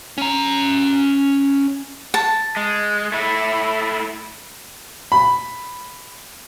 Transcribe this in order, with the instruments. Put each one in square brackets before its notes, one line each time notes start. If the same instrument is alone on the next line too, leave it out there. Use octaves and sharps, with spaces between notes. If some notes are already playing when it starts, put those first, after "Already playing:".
[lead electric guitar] C#4 A#5
[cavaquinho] A5
[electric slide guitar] G#3
A3 E4
[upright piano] B5